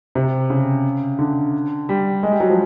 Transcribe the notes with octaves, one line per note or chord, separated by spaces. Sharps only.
C3
C#3
D3
G3
G#3
G3
F#3
F3